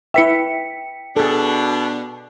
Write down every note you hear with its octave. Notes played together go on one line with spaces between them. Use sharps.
E4 B4 E5 G5 B6 C#7
B2 D4 G#4 A4